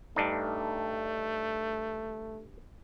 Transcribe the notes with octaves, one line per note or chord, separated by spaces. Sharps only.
G2 A3 D4 D#4